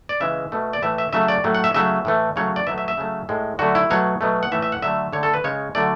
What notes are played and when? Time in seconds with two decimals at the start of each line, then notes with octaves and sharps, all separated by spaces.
0.09 D5
0.20 C#3 E3 G#3 E5
0.52 B2 A3
0.73 D5
0.82 A2 E3 A3 E5
0.98 E5
1.13 C#3 F#3 A3 E5
1.28 D5
1.44 A2 F#3 A3
1.55 F#5
1.64 E5
1.74 C#3 F#3 A3 E5
2.05 A2 E3 A3
2.36 C#3 F#3 A3 C#5
2.56 D5
2.67 B2 F#3 A3 E5
2.78 E5
2.88 E5
2.97 C#3 F#3 A3
3.29 A2 G#3
3.59 D3 F#3 A3 F#4
3.75 E4
3.90 B2 F#3 A3 C#5
4.21 B2 F#3 A3
4.43 F#5
4.52 A2 E3 A3 E5
4.62 E5
4.72 F#5
4.82 D3 F#3 A3 E5
5.13 D3 A3 C#5
5.23 A4
5.34 B4
5.44 C#3 G#3 C#5
5.75 D3 F#3 A3 D5